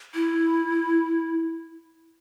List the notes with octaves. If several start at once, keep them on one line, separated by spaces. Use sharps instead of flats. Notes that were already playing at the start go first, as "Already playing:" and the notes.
E4